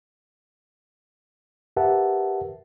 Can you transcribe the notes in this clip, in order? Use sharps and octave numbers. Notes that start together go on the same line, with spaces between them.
G4 A#4 B4 E5 F#5 A5